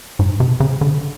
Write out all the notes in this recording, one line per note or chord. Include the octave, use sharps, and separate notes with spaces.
G#2
C3
C#3
D3